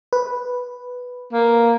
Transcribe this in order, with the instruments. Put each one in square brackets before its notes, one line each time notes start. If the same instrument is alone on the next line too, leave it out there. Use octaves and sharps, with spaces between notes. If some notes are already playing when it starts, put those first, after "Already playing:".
[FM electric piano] B4
[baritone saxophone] A#3